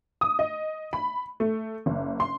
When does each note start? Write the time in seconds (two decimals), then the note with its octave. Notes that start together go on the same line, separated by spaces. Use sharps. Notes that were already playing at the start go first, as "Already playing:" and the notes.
0.21 D#6
0.39 D#5
0.93 B5
1.40 A3
1.86 F#1
2.20 C6